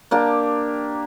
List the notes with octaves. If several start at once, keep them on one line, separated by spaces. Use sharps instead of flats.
A#3 D4 G4